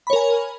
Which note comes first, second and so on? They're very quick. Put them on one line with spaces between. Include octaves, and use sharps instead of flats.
B5 C#5 A#4 G#5